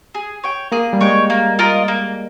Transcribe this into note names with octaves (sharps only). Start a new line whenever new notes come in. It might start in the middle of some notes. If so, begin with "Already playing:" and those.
G#4
C#5 G5
A#3 G#4
G3
G#3 C#5 G5
A#3
F4 A#4 D#5
A#3